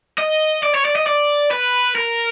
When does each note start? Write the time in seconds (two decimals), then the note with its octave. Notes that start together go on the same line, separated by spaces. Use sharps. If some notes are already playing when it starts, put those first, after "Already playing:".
0.18 D#5
0.62 D5
0.74 C#5
0.85 D5
0.96 D#5
1.07 D5
1.51 B4
1.95 A#4